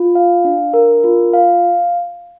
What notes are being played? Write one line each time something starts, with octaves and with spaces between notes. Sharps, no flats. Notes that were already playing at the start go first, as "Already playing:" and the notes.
Already playing: F4
F5
D4
A#4
F4
F5